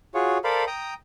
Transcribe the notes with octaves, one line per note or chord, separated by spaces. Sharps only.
F4 F#4 G#4 C#5
A4 A#4 C5 D5 F5 B5
G5 A#5 D#6